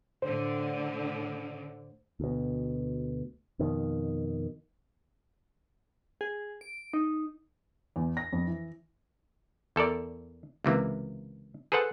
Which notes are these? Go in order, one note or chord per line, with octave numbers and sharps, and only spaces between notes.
A2 D3 C5
D2 B2
F2 B2 D#3
G#4
D7
D#4
E2
A#6
F2
E3
E2 A4 A#4 D5
C#2 C3 E3 A#3
G#4 A4 B4 C5 F#5 A5